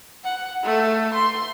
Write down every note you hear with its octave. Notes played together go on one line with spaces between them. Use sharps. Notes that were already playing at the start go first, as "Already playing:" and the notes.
F#5
A3
C6